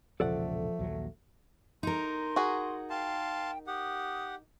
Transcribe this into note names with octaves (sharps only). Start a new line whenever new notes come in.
E1 A#1 C#3 F3 A3 A4 D5 F#5
A#1 D#2 F#3
D#4 A#4 C6
F#4 G#4
F5 G5 A5 C6
G4 F#5 D#6